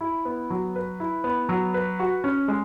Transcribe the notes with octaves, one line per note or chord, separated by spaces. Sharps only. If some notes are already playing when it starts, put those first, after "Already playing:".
E4
B3
F#3
B4
E4
B3
F#3
B4
F#4
C#4
G#3